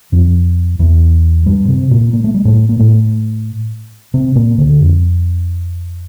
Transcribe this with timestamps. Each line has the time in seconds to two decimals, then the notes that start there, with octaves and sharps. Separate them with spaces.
0.12 F2 F3
0.79 E2 E3
1.46 G2 G3
1.68 C3 C4
1.91 A#2 A#3
2.13 A#3
2.24 A3
2.34 G3
2.45 A2 A3
2.69 A#3
2.79 A2 A3
4.14 C3 C4
4.35 A#2 A#3
4.58 D2 D3
4.81 F2